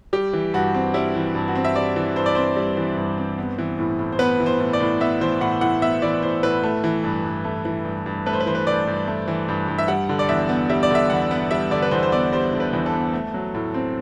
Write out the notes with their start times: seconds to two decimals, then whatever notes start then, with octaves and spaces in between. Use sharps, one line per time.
0.13 G3 G4
0.33 E3
0.54 G2 F#4
0.75 C4
0.94 G3 E4
1.15 E3
1.35 G2
1.48 F#4
1.55 C4
1.65 E5
1.76 G3 D5
1.96 E3
2.16 G2 C5
2.26 D5
2.35 C4 C5
2.56 G3
2.77 E3
2.97 G2
3.18 C4
3.38 B3
3.58 E3
3.79 A2
3.99 A2
4.12 C5
4.19 B3 B4
4.40 E3
4.46 C5
4.60 A2
4.73 D5
4.81 A2
5.00 B3 E5
5.21 E3 C5
5.41 A2 F#5
5.61 A2 F#5
5.82 B3 E5
6.02 E3 D5
6.22 A2 C5
6.43 A2 B4
6.63 A3
6.84 E3
7.04 G2
7.24 G2
7.45 A3
7.65 E3
7.85 G2
8.06 G2
8.26 A3 B4
8.33 C5
8.40 B4
8.46 E3 C5
8.55 B4
8.67 G2 D5
8.87 G2
9.07 A3
9.28 E3
9.48 G2
9.68 G2
9.78 E5
9.88 G3 F#5
10.09 D3
10.19 D5
10.29 E2 E5
10.49 B3
10.70 G3 E5
10.83 D5
10.91 D3 E5
11.10 E2 F#5
11.31 B3
11.51 G3 E5
11.71 D3 D5
11.82 B4
11.91 E2 C5
12.03 C5
12.12 B3 D5
12.32 G3 C5
12.53 D3
12.60 B4
12.73 E2
12.86 A4
12.93 B3
13.13 A3
13.34 F#3
13.55 A2
13.74 C4